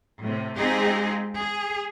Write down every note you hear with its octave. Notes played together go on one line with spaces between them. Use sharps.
A2 C3
G#3 C4 D#4 F4 G4 G#4
G#4